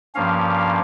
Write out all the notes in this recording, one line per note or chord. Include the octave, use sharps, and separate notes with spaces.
G2 F3 A#3 C#4 F5